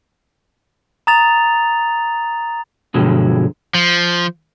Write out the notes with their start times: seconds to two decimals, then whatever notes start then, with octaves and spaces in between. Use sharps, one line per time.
1.07 A#5 D#6 A6 F7
2.94 G2 B2 D3 F3 F#3 G#3
3.75 F3